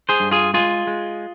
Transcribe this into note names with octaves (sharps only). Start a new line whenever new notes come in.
G#4 C5
G2
F4 G#4
G#3 F4 G#4
G#3